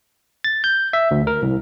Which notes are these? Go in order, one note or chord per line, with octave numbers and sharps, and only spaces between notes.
A6
G6
E5
D2
A#4
C2